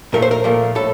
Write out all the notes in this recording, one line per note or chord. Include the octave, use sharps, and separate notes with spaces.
A#2 F3 A3 A#4
C5
A#4
A#2 F3 A3
A2 A3 A4